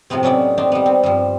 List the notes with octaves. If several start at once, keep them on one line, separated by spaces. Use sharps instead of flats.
A2 C3 F3 B3 C4
F#3 C#4 D#4 E4 D5
C4 D4 D#4
G3 B3
C4
G2 F3